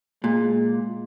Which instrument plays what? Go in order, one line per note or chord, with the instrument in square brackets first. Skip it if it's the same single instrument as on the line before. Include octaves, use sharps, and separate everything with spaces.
[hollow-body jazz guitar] A#2 [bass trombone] G#3